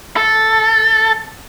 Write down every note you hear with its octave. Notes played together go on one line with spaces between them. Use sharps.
A4